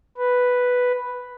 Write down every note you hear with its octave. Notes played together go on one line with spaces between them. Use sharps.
B4